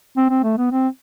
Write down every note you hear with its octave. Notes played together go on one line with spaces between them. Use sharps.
C4
C4
A3
B3
C4